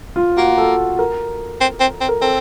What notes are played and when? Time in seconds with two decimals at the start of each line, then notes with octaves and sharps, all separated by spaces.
0.16 F4
0.37 A#3 F#4
0.58 A4
0.99 A#4
1.60 C4
1.80 C4
2.01 C4
2.09 A#4
2.21 C4 A4